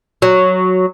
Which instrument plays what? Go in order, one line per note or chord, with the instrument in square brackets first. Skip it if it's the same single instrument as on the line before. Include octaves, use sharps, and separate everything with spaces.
[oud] F#3